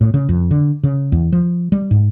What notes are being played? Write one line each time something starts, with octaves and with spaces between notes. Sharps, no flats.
A2
C#3
F2
D3
C#3
E2
F3
G3
G#2